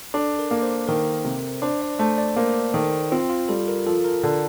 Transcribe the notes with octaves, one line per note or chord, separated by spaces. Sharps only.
D4 A4
A#4
A#3
C5
D#3 A#4
C3
D4 C5
D5
A3 C5
D5
A#3 C5
D#3 A4
C4 F4
F4
G3 A4
A#4
F3 A4
A#4
D3